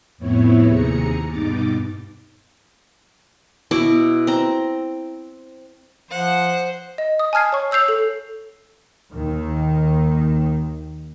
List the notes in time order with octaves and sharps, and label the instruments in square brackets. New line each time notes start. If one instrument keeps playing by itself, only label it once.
[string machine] F2 A2 B3 C4 E4 C#5
D#2 C3 G#4 A#5 C#7
G2 B2 D#4 D6 A6
[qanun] B2 E4 C#6 D6
C4 A#5
[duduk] F3 [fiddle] C5 [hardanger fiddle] F#5
[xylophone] D#5
D#6
G#5 A5 F6 G#6 C7
C#5 C#6
C#5 E6 G6 C7 F7
A4
[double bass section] D#2 D#3